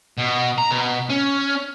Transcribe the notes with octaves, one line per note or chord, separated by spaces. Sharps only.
B2
A#5
B2
C#4